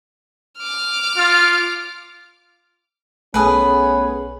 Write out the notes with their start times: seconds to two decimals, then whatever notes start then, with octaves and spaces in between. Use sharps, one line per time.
0.59 D6 F6
1.17 F4
3.34 B1 A3 B3 C#4 G#4 B4 G#5 D#6